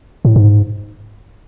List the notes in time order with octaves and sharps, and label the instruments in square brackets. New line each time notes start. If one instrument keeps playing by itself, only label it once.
[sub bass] A2
G#2